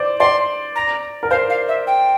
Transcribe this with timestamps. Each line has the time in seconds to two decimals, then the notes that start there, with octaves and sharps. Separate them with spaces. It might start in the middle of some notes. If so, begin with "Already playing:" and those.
Already playing: C5 D5
0.19 D5 C6
0.75 A#5
1.23 A#4
1.30 C5 F5
1.49 F5
1.68 E5
1.87 G5